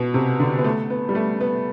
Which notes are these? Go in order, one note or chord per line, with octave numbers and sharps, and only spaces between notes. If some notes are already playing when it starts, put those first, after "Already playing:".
Already playing: B2
C3
D3
B3
A3
B3
G3
A3
B3